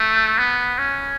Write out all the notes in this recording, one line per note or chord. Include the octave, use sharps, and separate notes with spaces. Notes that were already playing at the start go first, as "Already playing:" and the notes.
Already playing: A3
B3
C#4